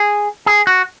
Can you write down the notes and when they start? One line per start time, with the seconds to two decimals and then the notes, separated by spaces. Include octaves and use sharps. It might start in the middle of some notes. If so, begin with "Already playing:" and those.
Already playing: G#4
0.46 G#4
0.67 F#4